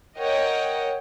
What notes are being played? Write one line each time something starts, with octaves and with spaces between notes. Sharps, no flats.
A#4 C#5 D#5 F#5 G5